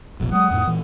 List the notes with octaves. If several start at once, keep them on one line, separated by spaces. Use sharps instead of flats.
F1 A#1 B2
F#3 G#3 F#5 D#6
F2 A2
A#2 E3